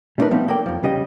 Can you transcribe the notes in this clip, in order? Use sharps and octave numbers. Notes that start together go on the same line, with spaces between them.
G3 A3 D4 D#4 A#4 B4
F3 G3 A3 B3 C4 D#4
A#3 A4 A#4 D5 G5
F2 F3
C#3 G3 D#5 G5